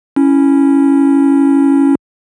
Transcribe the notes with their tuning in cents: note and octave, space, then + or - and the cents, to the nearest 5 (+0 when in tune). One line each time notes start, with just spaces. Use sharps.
C#4 +0 E4 +0